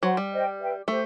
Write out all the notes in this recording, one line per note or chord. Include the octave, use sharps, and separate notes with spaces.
F#3 C5 F#5 C6
G3
C5 D#5 G5
B4 E5 G5
A3 G4 C5